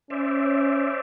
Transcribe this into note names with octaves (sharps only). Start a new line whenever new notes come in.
C#4 C5 D5 E5